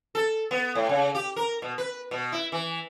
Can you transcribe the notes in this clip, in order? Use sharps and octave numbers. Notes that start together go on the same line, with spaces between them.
A4
B3
A2
C#3
G4
A#4
B2
B4
B2
E4
E3